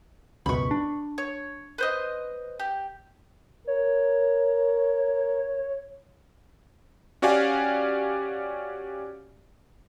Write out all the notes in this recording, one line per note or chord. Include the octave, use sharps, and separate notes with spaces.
C#2 F#2 B2 B5 C#6
D4
C#5
B4 C5 D#5
G4
A#4 C#5
C#4 F#4 G4 D5 F5 G#5